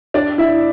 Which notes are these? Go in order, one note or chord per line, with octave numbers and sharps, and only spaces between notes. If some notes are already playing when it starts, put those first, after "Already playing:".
D4 D5
E4 E5